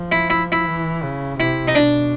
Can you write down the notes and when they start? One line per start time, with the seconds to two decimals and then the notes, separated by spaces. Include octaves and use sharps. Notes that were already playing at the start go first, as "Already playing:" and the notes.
Already playing: F3
0.12 E4
0.30 E4
0.52 E4
0.67 E3
1.03 C#3
1.39 C3 E4
1.68 D#4
1.75 B2 D4